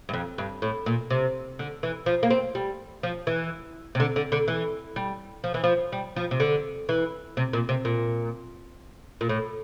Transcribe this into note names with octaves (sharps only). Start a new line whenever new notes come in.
G2
F2
G2
A2
A#2
C3
D3
E3
F3
A#3
C4
G3
F3
E3
C3
D3
D3
D3
E3
G3
F3
E3
F3
G3
F3
C3
D3
E3
C3
A#2
C3
A#2
A#2
A2